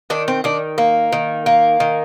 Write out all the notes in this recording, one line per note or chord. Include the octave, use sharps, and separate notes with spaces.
D#3 D4
C4
D#3 D4
A#3
D#3
A#3
D#3